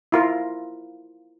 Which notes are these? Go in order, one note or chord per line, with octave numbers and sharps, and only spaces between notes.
E4 F4 A#4